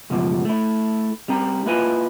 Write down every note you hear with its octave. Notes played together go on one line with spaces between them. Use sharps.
C#2 F#2 B2 F3 G3
A3 E4
G3 C4 A#5
A#3 E4 F4 B4 D#5 G#5